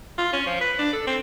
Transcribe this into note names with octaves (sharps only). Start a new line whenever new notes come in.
F4
C#4
F3
B4
D4
A4
C4